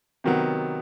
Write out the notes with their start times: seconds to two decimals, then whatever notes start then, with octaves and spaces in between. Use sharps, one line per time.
0.24 C3 D#3 F#3 B3